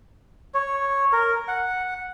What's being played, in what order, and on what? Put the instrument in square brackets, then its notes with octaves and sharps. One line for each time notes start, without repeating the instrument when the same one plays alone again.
[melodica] C#5
A#4
F#5